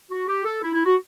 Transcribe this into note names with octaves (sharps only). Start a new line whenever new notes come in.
F#4
G4
A4
E4
E4
F#4